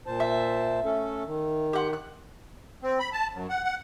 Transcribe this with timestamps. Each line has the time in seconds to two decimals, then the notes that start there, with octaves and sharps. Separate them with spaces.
0.06 A#2 C5 A5
0.20 E5
0.84 A3 C#4 A4
1.26 D#3
1.73 G4 F#5 C6
1.93 F#6
2.83 C4
2.99 B5
3.13 A5
3.33 F#2
3.49 F#5
3.64 F#5